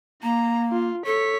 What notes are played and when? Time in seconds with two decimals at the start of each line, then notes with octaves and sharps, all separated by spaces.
0.23 A#3 A#5
0.71 F4
1.06 A4 C#5 B6